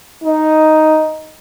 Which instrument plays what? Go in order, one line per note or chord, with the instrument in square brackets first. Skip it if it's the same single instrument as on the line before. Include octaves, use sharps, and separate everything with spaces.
[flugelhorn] D#4